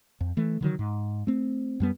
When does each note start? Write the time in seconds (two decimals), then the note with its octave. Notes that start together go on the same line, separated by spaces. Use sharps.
0.21 F2
0.37 E3 A3
0.61 D3 D#3 F#3
0.79 G#2
1.27 A3 C4
1.80 F#2 G3 B3